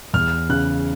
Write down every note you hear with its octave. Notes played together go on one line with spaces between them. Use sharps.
E2 F6
C#3 F#6